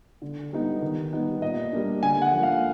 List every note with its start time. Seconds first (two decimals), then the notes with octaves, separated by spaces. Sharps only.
0.22 D3
0.52 G3 B3 D#4
0.82 D#3
1.12 G3 B3 D#4
1.41 A#2 D#5
1.72 G3 A#3 D4
2.03 D3 G#5
2.22 F#5
2.33 F3 A#3
2.43 F5